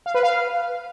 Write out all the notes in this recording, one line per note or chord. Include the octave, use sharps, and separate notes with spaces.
F5
B4
F5